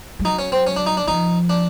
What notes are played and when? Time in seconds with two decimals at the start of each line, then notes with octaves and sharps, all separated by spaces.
0.19 G3
0.25 F#3 D#4
0.39 C#4
0.52 C4
0.67 C#4
0.76 D4
0.86 D#4
0.97 D4
1.08 F3 D#4
1.49 D4